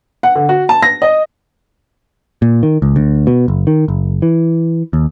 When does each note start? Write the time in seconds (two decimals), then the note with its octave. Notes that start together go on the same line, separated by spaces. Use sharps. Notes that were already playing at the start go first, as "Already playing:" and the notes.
0.23 F#5
0.35 D3
0.49 F#4
0.69 A5
0.83 A#6
1.02 D#5
2.42 A#2
2.63 D#3
2.82 C#2
2.96 D2
3.27 B2
3.48 F#1
3.67 D#3
3.88 F#1
4.22 E3
4.93 D#2